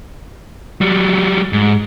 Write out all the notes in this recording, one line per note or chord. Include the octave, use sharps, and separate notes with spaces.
F#3 G3
G#2